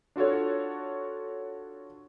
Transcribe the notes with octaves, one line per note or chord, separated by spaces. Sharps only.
D4 F4 F#4 A4 C#5